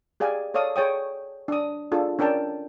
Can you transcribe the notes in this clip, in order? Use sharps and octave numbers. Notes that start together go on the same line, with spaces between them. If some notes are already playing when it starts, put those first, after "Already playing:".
G4 G#4 D5 F5 G#5
A4 C#5 D5 F5 D#6
G#4 C#5 G5 D#6
D4 D#6
D4 F4 G#4 A4
C#4 D4 A#4 G5 A5